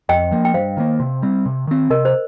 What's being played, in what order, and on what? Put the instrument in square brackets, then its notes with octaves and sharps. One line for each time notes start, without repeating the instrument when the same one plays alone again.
[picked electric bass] F2 [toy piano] D#5 G5
[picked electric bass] F3 A#3
[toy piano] G5
[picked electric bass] G2 [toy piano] C5 F5
[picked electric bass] D#3 A#3
C3
G3 C4
C3
D#3 C4
[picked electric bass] C3 [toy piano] A#4 D#5
[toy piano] C5